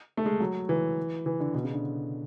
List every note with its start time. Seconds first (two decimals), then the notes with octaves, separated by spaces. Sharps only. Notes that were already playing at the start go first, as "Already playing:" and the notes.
0.17 A3
0.26 G#3
0.40 F#3
0.69 E3
1.26 E3
1.40 D3
1.54 B2
1.64 C#3
1.73 D3